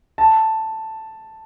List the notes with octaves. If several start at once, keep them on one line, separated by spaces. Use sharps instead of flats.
A5